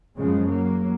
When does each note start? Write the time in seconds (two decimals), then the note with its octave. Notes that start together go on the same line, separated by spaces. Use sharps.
0.17 F#2 C#3 F3 G#3
0.49 F#3 A#3